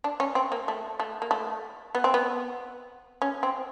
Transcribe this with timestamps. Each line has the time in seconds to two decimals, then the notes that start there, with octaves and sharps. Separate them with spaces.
0.04 D4
0.20 C#4
0.35 C4
0.52 A#3
0.68 A3
1.00 A3
1.22 A#3
1.31 A3
1.95 B3
2.04 C4
2.14 B3
3.22 C#4
3.43 C4